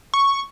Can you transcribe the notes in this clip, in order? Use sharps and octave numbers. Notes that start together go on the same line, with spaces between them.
C#6